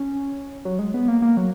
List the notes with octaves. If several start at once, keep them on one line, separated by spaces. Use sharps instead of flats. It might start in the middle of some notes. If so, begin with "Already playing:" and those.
Already playing: C#4
F#3
G#3
B3
A#3
A#3
F#3